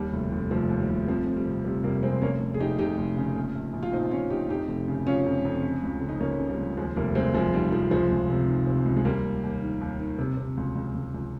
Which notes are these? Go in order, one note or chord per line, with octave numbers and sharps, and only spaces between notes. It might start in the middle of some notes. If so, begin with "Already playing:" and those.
Already playing: D#2 G3
F1
F1
F1 F3
D#2
G3
F1
F2 F3
F2
G3
C3
C3 G3
F1 G3 A#3
C3 G#3 C4
F1 A#3 C#4
F1
G#4
F1 D#4 G4
F1 D#4 G4
F1
C#3
A#1
A#1
A#1
F4
A#2 C4 D#4
A#1 C#4 F4
A#1 D#4 G4
F2 D#4 G4
F1
C#3
C#3 C#4 F4
F2
F2
C#3
C#2
C#3
D#4
C#2 A#3 C#4
C#3
G3 A#3
C#2
D#2 F3 G#3
F1 G3 A#3
F1 G#3 C4
F1 F3 G#3
D#3 G3
F1 F3
C#2 F3 G#3
C#2
C3
D#3
C3
C#2
G#3
D#2 G3 A#3
D#2
D#2
D#3
D#2
D#3
C3
C3
C#2
C#2
C#2
C#2